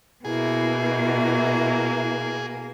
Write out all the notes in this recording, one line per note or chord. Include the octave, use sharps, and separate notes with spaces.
B2 A#3 E4 G#4